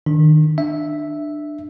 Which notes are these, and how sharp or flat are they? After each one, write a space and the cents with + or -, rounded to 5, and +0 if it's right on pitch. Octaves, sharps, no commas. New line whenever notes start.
D#3 -10 D4 +5
D4 +20 E5 +0